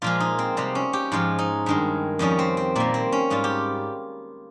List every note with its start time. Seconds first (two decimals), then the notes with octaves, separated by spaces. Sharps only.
0.02 A#2 F3 G#3 F4
0.20 D#4
0.39 C4
0.57 C3 G3 C4
0.75 C#4
0.93 G4
1.12 G#2 F3 G#3 F4
1.39 D#4
1.66 G2 D#3 G#3
2.19 F2 D#3 G3 C#4
2.39 C4
2.57 C4
2.76 A#2 G3 A#3
2.94 C4
3.12 C#4
3.30 G#2 G3 F4
3.44 G4